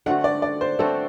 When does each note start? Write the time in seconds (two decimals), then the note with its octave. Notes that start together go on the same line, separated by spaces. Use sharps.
0.06 D3 A3 C4 F#4 F#5
0.24 D5
0.42 D5
0.61 C5
0.79 D3 A3 C4 F#4 A4